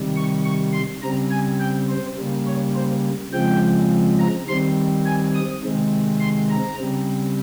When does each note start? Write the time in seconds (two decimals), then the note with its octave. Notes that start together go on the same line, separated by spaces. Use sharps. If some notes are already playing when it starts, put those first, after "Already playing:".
Already playing: C3 D#3 G3
0.16 C#6
0.45 C#6
0.73 C6
1.02 C#3 G3 C4 A#5
1.31 G#5
1.60 G5
1.89 C5
2.18 C#3 G3 A#3
2.47 C#5
2.75 C5
3.32 C#3 F3 G#3 C4 G5
4.19 A#5
4.48 D#3 G3 C4 C6
5.06 G#5
5.35 D#6
5.63 C3 D#3 G#3 C4
6.20 C6
6.50 A#5
6.78 C#3 G3 C4